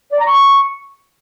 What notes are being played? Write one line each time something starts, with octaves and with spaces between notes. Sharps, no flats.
D5
A#5
C#6